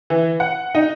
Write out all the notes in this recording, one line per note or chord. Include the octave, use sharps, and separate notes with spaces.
E3
F#5
D#4